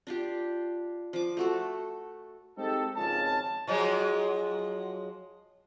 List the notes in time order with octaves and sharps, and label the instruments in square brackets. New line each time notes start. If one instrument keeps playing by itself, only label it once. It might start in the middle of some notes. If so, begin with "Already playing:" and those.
[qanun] D4 F4 G4
F3 D6
A3 F#4 A4
[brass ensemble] G#3 C4 D#4 G4 A4
G#1 C#2 F3 C#4 A5
[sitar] F3 F#3 G#3